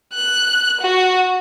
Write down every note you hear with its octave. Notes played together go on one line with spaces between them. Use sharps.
F#6
F#4